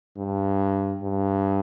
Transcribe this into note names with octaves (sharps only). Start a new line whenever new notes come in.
G2
G2